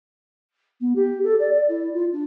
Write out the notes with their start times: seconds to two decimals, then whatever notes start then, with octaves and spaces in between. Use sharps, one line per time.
0.81 B3
0.95 G4
1.24 A4
1.39 D5
1.54 D5
1.69 E4
1.94 F4
2.13 D4